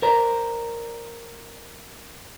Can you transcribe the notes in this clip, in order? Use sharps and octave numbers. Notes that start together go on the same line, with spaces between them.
A#4 C5 D5 A#5